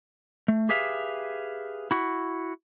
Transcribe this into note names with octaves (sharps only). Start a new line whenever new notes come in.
A3
G4 G#4 B4 E5 F5
E4 F#4